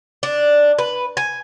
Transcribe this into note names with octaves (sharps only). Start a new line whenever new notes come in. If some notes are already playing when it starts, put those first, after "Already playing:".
D4
B4
G#5